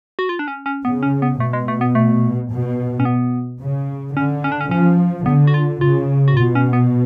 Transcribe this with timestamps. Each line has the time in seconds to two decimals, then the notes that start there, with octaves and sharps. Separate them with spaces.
0.19 F#4
0.29 F4
0.39 D4
0.48 C#4
0.66 C#4
0.84 C#3 B3
1.03 C#4
1.22 B3
1.40 B2 A3
1.53 G#3
1.68 A3
1.81 B3
1.95 A3
2.50 B2
3.00 C#4
3.05 B3
3.61 C#3
4.16 D3 C#4
4.44 C#4
4.52 D4
4.61 C#4
4.71 F3 C#4
5.26 D3 B3
5.47 F#4
5.54 F4
5.81 C#3 F4
6.28 F#4
6.36 B2 F4
6.55 C#4
6.73 B3